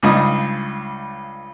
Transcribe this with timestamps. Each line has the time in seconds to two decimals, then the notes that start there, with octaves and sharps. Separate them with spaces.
0.03 C#2 G2 D#4 D#6